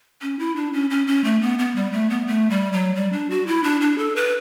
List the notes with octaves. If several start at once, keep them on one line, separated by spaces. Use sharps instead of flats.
C#4
E4
D4
C#4
C#4
C#4
A3
B3
B3
G3
A3
B3
A3
G3
F#3
G3
D4
F#4
E4
D4
D4
A4
B4